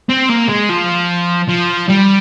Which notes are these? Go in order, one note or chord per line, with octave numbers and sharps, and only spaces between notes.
C4
A#3
G#3
F3
F3
G3